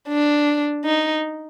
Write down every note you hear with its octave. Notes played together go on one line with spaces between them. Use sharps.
D4
D#4